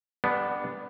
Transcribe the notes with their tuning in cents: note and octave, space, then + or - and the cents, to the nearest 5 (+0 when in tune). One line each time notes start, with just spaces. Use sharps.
G3 +25 B3 +0 D4 +0